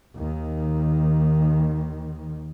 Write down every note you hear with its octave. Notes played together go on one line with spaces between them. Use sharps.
D#2 D#3